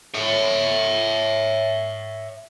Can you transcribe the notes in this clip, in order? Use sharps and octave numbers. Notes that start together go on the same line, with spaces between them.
C#5 E5